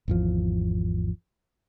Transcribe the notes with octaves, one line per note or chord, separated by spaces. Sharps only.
G#1 E2 F3